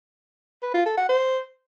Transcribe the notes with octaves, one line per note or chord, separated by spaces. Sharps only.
B4
F4
A4
F#5
C5